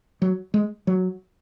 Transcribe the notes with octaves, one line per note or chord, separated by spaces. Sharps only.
F#3
G#3
F#3